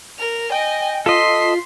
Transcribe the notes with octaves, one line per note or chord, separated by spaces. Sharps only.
A#4 F7
D#5 G5 G#5
F4 A4 D#5 C6 B6